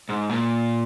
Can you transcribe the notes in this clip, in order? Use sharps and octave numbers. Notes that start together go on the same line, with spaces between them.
G#2
A#2